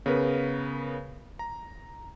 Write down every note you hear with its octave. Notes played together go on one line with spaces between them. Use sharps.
C#3 B3 A#4 B4
A#5